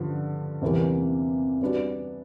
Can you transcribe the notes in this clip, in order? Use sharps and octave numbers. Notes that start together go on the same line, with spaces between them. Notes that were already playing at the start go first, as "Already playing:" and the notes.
Already playing: G2 D3 F3
E2 C3 E3 G3 A#3
G3 B3 D4 F#4